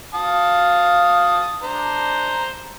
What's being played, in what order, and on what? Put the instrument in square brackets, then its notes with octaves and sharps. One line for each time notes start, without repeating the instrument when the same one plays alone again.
[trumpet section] F5 [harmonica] A5 D#6
[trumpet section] D4 [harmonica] C5 A#5